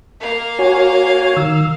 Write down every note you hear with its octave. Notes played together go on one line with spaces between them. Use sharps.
A#3 F5
F#4 C#5 G#5
D#3 E6